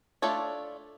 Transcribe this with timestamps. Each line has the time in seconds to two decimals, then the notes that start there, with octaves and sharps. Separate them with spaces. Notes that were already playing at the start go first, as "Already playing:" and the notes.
0.22 A3 D4 F4 A4 C#5